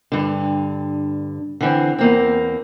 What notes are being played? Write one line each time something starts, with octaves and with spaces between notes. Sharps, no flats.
G2 D3
D3 E3 C4
E2 A#3 C4